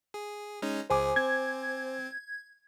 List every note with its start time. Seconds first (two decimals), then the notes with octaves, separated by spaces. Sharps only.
0.14 G#4
0.62 G#3 C#4 D#4
0.90 C#2 G#4 C5 G#5 D6
1.16 C4 G#6